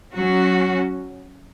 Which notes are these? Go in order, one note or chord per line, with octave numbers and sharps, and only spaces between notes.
F#3 C#4 F#4